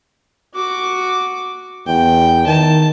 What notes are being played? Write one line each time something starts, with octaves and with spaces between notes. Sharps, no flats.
F#4 D6
E2 G5
D#3 A5